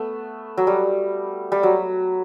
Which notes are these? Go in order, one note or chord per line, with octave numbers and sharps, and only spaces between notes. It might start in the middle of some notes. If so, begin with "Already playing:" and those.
Already playing: A3 B3
F#3
G3
G3
F#3